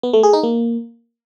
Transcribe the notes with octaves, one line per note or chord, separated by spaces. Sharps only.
B3
A3
G#4
D#4
A#3